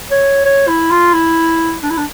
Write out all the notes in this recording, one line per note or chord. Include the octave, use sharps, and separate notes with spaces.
C#5
C#5
E4
F4
E4
D4
E4
D4